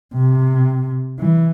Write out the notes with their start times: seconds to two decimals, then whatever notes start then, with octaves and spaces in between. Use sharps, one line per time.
0.14 C3
1.20 E3